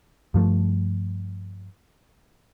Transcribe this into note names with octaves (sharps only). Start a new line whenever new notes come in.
G2 F3 A3